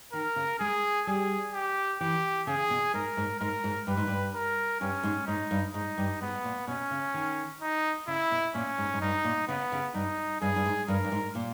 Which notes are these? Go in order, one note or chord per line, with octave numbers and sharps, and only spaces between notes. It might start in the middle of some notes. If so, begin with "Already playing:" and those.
D#3 A#4
C#3
G#3 G#4
G3 G#4
G4
E3 G4
C#3 G#4
B2
G#2 A#4
G#2
G#2 A#4
G#2
G2 B4
G#2
G2
A#4
G2 C#4
G#2
G#2 D#4
G2
G#2 D#4
G2
G#2 B3
A#2
B2 C#4
C#3
D#3
D#4
C#3 E4
B2
A#2 C#4
G#2
G#2
G2 D#4
A#2
C#3 B3
C#3
G2 D#4
G2 G#4
G2
G#2
G2 A#4
G2
G#2
A#2